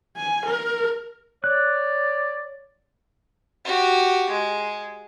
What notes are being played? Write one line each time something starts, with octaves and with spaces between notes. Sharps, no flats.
G#5
A#4
C#5 D5 F#6
F#4 G4
G#3